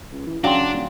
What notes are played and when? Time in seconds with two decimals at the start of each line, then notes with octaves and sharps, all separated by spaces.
0.12 C#2
0.27 E3
0.44 C#3 F#3 D4 F5 G5 C6
0.72 D#1